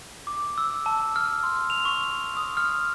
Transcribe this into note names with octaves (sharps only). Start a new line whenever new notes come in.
D6
E6
A5
F6
C6
F7
C#6
D#6
F6